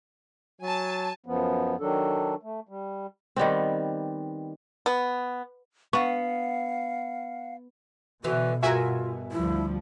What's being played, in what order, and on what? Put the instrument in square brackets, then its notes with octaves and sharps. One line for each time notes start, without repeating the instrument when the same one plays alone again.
[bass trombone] F#3 [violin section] G#5 A5
[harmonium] F#2 F3 B3
D#3 F#3 D4 A4
A3
G3
[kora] D#3 G3 B3 C4
[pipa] B3
[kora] B3 [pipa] D4 C#6 [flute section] F5 F#5
[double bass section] B2 [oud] D3 E3 B3 [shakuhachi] F#4
[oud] G2 G#4 A#4 [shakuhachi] F4 [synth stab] F#4 E5 G#5
[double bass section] D2 F3 G3 [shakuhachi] E4